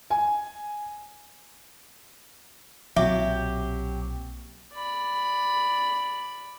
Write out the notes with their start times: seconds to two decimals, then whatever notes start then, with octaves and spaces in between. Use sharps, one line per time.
0.10 G#5
2.96 B1 A#2 F#3 C4 G4 E5
4.74 D5 B5